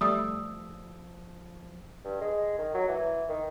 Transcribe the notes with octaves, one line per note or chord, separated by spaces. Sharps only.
F3 G3 A3 D#6 E6
G2
G#3
D#3
F#3
E3
D#3